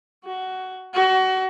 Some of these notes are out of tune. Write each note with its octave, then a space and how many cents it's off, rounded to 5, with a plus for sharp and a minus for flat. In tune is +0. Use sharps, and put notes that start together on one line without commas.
F#4 +15
F#4 +25